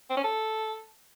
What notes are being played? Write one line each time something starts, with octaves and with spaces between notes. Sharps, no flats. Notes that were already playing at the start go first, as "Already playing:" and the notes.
C4
C#4
A4